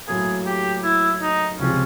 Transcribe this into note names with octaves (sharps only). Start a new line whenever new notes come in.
A2 F#3 A#3 G#4
G4
E4
D#4
C#2 C3 F3 G#3 C#4